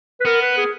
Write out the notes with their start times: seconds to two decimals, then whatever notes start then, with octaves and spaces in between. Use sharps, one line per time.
0.20 B4
0.25 B3 A#4
0.42 B4
0.57 G#4